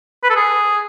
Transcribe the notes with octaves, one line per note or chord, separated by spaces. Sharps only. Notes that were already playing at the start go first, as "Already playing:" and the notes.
B4
A4
G#4